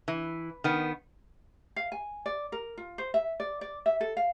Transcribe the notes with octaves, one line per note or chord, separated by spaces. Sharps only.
E3
D#3 B3
F5
G#5
D5
A#4
F4
C5
E5
D5
D5
E5
A4
F5